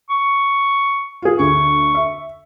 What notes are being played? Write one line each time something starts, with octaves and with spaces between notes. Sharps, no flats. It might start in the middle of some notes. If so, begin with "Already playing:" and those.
C#6
F4 G#4
D2 C#6
E5